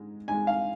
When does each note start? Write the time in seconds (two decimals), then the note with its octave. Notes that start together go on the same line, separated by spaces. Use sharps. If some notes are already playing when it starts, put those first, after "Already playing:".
Already playing: G#2 G#3
0.28 G#2 G#3 G#5
0.47 F5